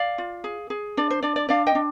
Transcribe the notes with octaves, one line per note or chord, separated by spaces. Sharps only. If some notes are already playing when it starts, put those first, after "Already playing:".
Already playing: D5 F5
F4
G#4
G#4
D4 D5
C5
D4 D5
D5
D4 D5 F5
D#5 G5
D4